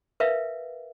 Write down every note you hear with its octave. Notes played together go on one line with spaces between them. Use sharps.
A#4 B4 E5 F5